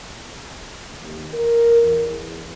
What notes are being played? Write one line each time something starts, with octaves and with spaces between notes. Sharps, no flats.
D#2
A#4
E2